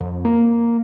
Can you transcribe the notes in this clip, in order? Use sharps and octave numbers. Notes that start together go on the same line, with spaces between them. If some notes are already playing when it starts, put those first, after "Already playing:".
F2
A#3